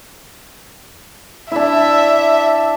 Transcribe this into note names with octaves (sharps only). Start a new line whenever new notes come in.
D4 E4 E5